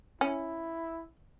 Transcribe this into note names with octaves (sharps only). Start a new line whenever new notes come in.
C#4 E4